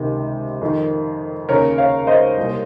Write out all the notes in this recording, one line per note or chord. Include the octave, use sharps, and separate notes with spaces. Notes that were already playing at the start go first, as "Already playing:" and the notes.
Already playing: C#2 C3 D#3
F2 D#3
D#2 C#3 A#4 C#5
C#5 F5
C5 D#5
C2 A#2